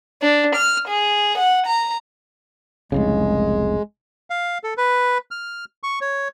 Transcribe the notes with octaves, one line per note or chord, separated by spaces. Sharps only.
D4
F6
G#4
F#5
A#5
F1 C2 C#3 G#3
F5
A4
B4
F6
C#6
C#5